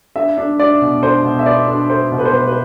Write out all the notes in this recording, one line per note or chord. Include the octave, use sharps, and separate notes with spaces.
D4 E5
D4
D4 D5
B2
D4 C5
B2
E5
B3 D5
D4
B3 C5
B2
B4
C5
B2 B4
B4